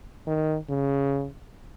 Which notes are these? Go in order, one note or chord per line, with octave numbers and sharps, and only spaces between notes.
D#3
C#3